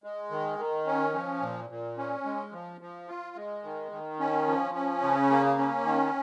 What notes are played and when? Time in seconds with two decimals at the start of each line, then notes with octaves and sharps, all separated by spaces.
0.04 G#3
0.31 D#3
0.59 D#3
0.86 C#4
1.15 F3
1.42 A#2
1.70 A#2
1.98 C#4
2.25 G#3
2.52 F3
2.81 F3
3.08 F4
3.36 G#3
3.64 D#3
3.91 D#3
4.20 C#4
4.47 F3
4.75 C#4
5.03 C#3
5.30 A#3
5.58 C#4
5.85 D#3